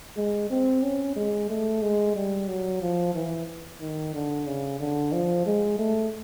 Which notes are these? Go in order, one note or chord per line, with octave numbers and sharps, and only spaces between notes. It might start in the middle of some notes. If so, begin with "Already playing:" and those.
G#3
C4
C#4
G#3
A3
G#3
G3
F#3
F3
E3
D#3
D3
C#3
D3
F3
G#3
A3